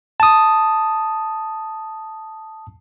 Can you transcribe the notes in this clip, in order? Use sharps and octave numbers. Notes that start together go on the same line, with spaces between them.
A5 D#6